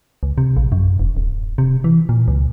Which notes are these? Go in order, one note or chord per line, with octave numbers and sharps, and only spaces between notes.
C#2
C3
A#1
F#2
E1
D1
C3
E3
A#2
C#2